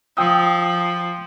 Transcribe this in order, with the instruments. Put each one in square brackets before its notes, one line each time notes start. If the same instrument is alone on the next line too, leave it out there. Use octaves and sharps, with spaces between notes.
[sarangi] F3 [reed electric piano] G5 D#6 E6